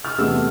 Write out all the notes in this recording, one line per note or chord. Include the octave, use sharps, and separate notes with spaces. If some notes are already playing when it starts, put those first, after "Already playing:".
F6
E2 C3 E3 A3 E6